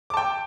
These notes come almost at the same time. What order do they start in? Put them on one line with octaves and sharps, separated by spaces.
D6 A5 G5